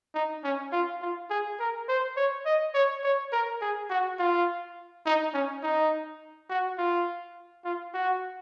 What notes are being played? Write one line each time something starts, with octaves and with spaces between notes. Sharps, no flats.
D#4
C#4
F4
F4
G#4
A#4
C5
C#5
D#5
C#5
C#5
A#4
G#4
F#4
F4
D#4
C#4
D#4
F#4
F4
F4
F#4